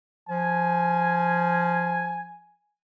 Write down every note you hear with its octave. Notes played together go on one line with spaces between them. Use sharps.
F3 G#5